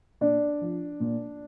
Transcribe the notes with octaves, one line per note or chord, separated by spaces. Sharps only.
A#2 D4 D5
F3
A#2